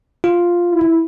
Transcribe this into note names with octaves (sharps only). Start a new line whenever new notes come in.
F4
E4